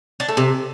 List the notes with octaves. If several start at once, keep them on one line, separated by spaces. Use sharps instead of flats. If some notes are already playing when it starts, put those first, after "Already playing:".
D4
A3
C3